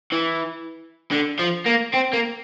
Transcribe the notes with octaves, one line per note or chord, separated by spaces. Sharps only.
E3
D3
F3
A#3
C4
A#3